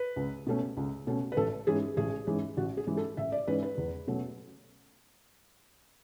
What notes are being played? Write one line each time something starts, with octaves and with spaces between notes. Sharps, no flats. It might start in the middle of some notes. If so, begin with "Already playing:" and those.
Already playing: B4
C#2
B2 A3 C#4
C#2
B2 A3 C#4
B4
A1 A4
G#2 E3 G#3 C#4 G#4
A1 G#4
G#2 E3 G#3 C#4
A1 F#4
G#4
G#2 E3 G#3 C#4
A4
A1 E5
D5
G#2 E3 G#3 C#4 B4
B4
E2
B2 F#3 A3 C#4